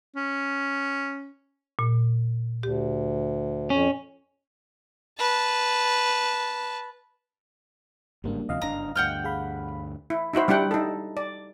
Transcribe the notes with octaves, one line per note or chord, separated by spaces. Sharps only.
C#4
A#2
D2 G4
F2 C#4
B4 A5
G1 G#2 C#3 G3 A#3 D4
D2 C3 F3 D#5 F5
F#1 G2 D4 A#5
D2 G2 F#5 G5 F6
G#4 F5 B5
E4
D#4 E4 F#4 C5
G3 D4 E4 F#5 G5
D#4 A4
D5